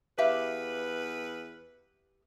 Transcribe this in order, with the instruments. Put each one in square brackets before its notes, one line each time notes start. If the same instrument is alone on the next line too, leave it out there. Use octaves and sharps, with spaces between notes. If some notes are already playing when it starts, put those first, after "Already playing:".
[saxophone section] E2 B4 [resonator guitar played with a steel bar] G4 E5 F5